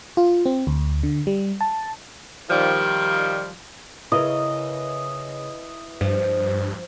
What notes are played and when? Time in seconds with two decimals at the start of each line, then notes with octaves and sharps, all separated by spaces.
0.17 F4
0.46 C4
0.67 D2
1.03 D3
1.27 G3
1.61 A5
2.49 D#3 F3 G3
4.12 C#3 E4 A#4 B4 D#5
6.01 G2 F3